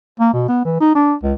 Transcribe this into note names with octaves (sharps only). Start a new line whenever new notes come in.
A#3
B2
B3
E3
D#4
D4
C#2